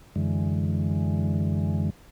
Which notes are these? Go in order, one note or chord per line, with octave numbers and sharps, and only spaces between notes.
F#2 D3 E3 G#3